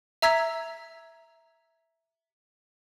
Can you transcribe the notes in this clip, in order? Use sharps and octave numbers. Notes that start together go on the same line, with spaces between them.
E5 A#5 E6 G#6 B6